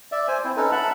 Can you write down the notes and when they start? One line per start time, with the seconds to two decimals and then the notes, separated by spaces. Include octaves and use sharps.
0.12 D5 E5
0.28 C5 G#5
0.44 C4 E4
0.57 C#4 D#4 A4 B4
0.72 E5 F#5 A5 B5